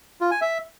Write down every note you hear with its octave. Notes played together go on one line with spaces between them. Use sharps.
F4
G#5
E5